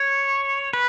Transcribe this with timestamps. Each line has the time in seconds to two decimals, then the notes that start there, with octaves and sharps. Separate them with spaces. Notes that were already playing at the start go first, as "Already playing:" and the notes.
Already playing: C#5
0.73 B4